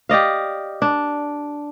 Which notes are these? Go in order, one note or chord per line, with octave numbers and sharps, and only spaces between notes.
G4 D5 D#5 F5
D4